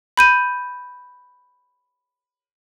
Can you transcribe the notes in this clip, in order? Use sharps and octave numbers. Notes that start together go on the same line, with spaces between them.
B5 G6 D#7